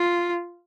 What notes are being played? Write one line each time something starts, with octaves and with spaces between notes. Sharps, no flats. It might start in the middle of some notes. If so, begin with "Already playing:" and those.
Already playing: F4